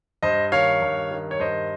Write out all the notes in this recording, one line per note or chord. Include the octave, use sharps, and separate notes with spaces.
G2 C5 D#5
D#3 C#5 F5
G2
D#3
C#5
G2 C5 D#5